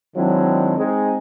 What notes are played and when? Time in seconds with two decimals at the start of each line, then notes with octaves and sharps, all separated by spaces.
0.16 D#3 F#3 G#3 C4 D4 E4
0.78 G#3 C4 D#4 G#4